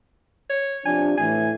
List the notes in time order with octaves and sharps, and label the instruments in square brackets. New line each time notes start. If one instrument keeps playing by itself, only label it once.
[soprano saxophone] C#5
[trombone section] C3 F3 D4 [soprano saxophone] G#5
[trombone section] A2 E3 [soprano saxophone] G#5